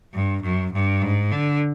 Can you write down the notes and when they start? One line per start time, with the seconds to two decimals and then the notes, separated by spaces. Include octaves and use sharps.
0.13 G2
0.43 F#2
0.73 G2
1.02 G#2
1.31 D3